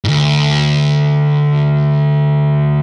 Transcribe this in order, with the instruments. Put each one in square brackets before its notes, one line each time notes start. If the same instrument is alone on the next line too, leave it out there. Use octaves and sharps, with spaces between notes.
[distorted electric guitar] D2 G#2